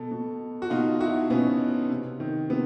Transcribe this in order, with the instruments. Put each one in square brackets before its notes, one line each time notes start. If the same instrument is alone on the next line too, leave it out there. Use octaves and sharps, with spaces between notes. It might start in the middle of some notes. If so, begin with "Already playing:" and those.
Already playing: [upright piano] B2 A4
B2
F#4
B2 D#4 F4
E4 F#4
B2 B3 C#4
C3
D#3
C3 B3